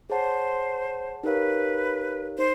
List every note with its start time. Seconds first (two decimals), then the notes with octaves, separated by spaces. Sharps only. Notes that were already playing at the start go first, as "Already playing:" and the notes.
0.10 G#4 C5 C#5 F#5 A5
1.24 D#4 G4 A#4 B4 C#5 F5
2.38 D#4 C5